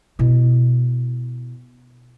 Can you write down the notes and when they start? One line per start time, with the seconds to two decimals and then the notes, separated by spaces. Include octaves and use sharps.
0.19 B2 E4